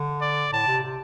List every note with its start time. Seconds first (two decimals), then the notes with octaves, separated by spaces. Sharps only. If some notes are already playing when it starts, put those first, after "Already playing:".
Already playing: D3
0.21 D5
0.52 A2 A5
0.67 C3
0.82 C3